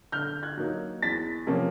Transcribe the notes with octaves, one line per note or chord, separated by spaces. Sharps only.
D3 F6 G6
F#6 G#6
F#3 A#3 D#4
E2 A6 B6
C3 F3 A#3 C#4